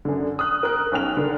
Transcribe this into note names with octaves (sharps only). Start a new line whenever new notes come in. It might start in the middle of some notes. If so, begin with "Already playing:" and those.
F#2 D3
D#6 F6 F#6
A#4 F#6
B1 C#4 G5 F6 F7
D3 A#4